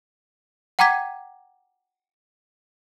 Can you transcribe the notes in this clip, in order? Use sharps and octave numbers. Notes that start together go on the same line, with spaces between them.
F#5 G5 A#5 D6 G#6 B6